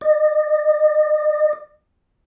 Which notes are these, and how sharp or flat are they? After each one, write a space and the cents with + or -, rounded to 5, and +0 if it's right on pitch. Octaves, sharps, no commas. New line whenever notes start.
D#5 -45